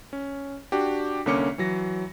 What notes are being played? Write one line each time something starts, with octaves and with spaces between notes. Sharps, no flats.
C#4
D4 F#4 G4
C2 D3 A#3 C#4 D6 C#7
E3 F#3 A#6